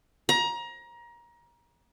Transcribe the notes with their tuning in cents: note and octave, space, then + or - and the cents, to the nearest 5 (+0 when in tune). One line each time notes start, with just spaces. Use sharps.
A#5 +25